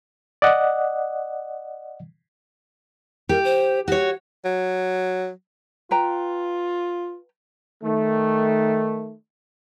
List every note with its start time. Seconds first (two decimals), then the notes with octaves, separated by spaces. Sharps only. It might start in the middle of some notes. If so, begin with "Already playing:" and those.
0.42 D5 D#5 F#5
3.29 G4 A#4
3.44 C5
3.88 F#4 G4 C#5
4.45 F#3
5.91 F4 B4 G5 A#5
7.83 D#3 A3